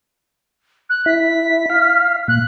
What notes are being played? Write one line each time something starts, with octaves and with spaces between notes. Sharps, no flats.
F#6
E4 B6
F5
A#2 F#6